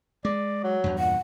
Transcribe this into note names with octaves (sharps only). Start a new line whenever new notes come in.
G#3 D5
F#3
E2 G2
A#2 F#5